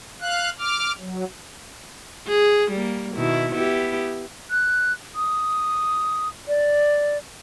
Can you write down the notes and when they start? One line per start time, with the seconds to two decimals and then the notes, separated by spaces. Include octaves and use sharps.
0.21 F5 F#6
0.59 D6 F6
0.99 F#3
2.28 G#4
2.72 G3 A#3
3.15 B2 D#3 E4
3.52 B3 E4 G4
4.51 F#6
5.15 D#6
6.48 D5